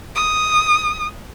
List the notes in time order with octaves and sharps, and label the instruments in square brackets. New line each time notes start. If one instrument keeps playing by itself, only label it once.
[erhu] D#6